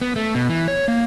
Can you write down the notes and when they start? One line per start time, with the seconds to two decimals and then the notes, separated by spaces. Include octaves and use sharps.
0.01 B3
0.16 A3
0.34 B2
0.50 E3
0.68 C#5
0.88 A#3